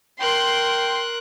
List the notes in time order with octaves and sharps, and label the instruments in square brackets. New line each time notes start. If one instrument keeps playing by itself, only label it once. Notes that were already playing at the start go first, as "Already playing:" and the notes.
[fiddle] A#4 F#6 [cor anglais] G5 [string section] C6